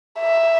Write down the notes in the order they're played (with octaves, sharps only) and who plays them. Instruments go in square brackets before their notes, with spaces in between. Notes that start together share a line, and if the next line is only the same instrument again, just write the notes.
[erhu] E5